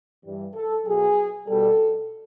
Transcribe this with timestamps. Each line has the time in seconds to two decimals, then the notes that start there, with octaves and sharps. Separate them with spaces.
0.23 G2 E3 G3
0.55 A4
0.86 B2 F#3 G#4
1.48 B2 G3 A4